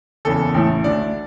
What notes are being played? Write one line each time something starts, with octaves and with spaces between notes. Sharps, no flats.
F#1 E2 C#3 A4
A1 A2 E3 A3
D2 D3 A3 D5